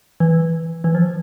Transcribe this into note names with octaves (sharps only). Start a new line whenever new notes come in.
E3
E3
F3